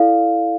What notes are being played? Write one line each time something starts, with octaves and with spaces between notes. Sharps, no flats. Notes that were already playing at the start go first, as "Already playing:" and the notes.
Already playing: E4 A4 D5 F5